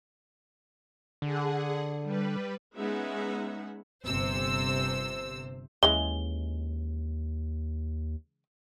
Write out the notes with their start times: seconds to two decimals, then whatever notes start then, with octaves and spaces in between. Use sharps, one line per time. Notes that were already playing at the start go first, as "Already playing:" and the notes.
1.22 D3 G#4 F#5
2.02 G3 B4
2.78 G#3 B3 C#4 D#4 E5 F#5
4.07 G1 C3 C5 E6
5.83 D#2 C#3 E3 G#3 G7